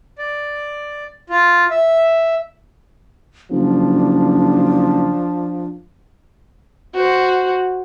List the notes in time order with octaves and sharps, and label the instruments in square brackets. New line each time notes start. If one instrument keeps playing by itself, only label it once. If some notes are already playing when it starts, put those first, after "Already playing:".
[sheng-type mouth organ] D5
F4
E5
[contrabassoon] F#1 [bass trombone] F3 [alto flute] D4
[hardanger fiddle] F#4 C5